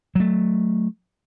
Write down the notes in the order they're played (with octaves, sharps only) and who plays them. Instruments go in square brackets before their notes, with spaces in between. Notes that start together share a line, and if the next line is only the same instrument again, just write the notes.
[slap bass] F#3 A3